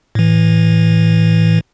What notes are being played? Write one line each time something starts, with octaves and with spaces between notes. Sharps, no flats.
A2 E3